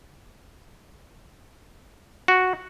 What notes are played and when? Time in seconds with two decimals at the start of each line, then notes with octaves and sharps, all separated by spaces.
2.28 F#4